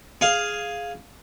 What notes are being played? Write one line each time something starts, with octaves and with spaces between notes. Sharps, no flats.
G#4 F5